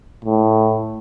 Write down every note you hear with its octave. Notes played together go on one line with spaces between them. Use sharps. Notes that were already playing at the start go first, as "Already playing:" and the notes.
A2